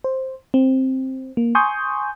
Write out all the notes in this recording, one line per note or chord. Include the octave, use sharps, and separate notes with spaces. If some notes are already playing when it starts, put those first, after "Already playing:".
C5
C4
A#3
G#5 C6 C#6 D#6 G6